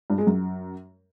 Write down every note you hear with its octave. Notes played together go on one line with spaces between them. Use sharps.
G2
G#3
F#2